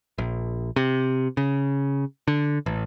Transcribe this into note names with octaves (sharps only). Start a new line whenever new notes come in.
A#1
C3
C#3
D3
A1